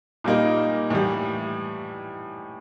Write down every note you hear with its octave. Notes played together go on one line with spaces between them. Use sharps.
A#2 G3 A#3 D#4
A2 E3 G3